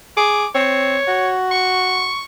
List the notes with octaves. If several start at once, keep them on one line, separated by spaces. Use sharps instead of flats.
G#4 D6
C4 C#5
F#4
C#6